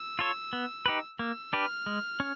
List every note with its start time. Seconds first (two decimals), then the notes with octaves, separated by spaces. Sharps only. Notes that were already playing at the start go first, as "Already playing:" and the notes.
Already playing: E6
0.19 F4 A4 C#5
0.53 B3
0.86 D#4 G4 B4
1.19 A#3 E6
1.53 D4 G4 B4 F6
1.86 G#3
2.20 C#4